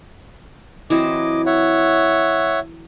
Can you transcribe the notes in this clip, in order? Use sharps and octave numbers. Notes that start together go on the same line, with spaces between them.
E3 F#3 C4 D#5 D6
C#5 E5 F#5